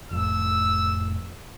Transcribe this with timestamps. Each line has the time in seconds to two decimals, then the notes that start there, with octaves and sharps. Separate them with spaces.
0.11 F1 F2 A2 E6